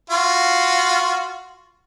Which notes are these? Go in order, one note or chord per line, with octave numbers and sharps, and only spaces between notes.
F4 F#4